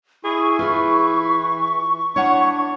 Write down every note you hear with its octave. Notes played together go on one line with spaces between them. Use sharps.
E4 G#4 C#6
E3 F4 G#4
D4 E4 C#5 F#5